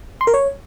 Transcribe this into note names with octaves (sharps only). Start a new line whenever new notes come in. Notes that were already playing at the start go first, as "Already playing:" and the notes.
C6
A#4
C#5